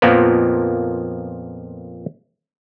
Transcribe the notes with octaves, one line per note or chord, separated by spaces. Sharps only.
F2 A#2 F3 A#3 B3